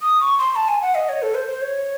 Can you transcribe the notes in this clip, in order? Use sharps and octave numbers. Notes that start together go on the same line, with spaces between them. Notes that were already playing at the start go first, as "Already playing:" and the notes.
D#6
C#6
C6
A5
G#5
F#5
D#5
C#5
A4
C5
C5
C#5